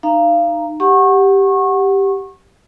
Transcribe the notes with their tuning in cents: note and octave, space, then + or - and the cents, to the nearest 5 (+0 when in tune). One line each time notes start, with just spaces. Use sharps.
D#4 -20 F5 -25 A#5 +0
G4 +0 F#5 +0 C#6 -25